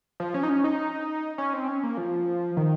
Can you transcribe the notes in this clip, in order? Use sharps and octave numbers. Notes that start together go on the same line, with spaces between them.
F3
C#4
D#4
C#4
D#4
C#4
C4
C#4
A#3
F3
D#3